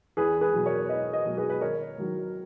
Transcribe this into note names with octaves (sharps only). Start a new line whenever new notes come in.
E2 G#4 B4
G#4 B4
B2 F#3
A#4 C#5
E2 B4 D#5
B4 D#5
B2 F#3
G#4 B4
B4
G#1 A#4 C#5
G#2 D#3 F#3